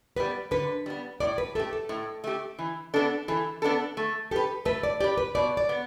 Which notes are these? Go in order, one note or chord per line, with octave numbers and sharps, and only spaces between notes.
G3 B3 B4
D3 B4
G3 B3
A2 D5
B4
A3 G4 A4
A4
A2
A3 G4
E3
B3 D4 A4
E3 A4
B3 D4 A4
A3
G4 A4 B4
A3 B4
D5
G4 B4 D5
B4
B2 D5
D5
B3